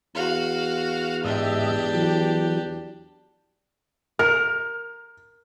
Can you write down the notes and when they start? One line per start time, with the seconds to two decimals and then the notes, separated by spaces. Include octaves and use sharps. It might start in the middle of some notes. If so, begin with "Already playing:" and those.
0.15 E2 F#4 F5
1.24 G#2 D4 G4 D#5 E5
1.94 E3 F#3
4.19 A#4 F6